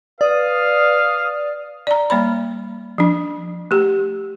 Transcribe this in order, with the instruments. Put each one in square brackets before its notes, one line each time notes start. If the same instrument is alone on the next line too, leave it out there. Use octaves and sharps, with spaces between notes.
[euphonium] B4 [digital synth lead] D5 [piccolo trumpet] F5 [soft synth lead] D#6
[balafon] D5 A#5
G3 A#3 C#5 B5
F3 D4
A3 G4